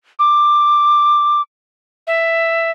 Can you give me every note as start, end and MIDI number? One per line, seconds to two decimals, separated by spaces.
0.19 1.41 86
2.07 2.71 76